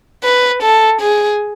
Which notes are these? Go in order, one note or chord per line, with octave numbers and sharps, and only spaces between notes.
B4
A4
G#4